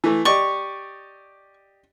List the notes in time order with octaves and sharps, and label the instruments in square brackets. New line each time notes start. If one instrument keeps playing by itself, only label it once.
[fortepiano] E3 A3
[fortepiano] G4 D5 D#5 [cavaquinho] C#6